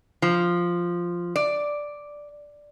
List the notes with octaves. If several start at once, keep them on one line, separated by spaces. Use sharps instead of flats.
F3
D5